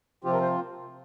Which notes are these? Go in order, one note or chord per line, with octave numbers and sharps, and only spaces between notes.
C3 F3 C4 F4 G4
A#4
C5